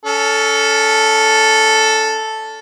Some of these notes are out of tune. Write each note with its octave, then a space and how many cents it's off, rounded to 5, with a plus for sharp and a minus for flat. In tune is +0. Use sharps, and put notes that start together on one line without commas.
C#4 +25 A4 +0